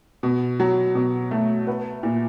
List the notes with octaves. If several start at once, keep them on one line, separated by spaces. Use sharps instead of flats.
B2
F#3
B2
A3
B3
A#2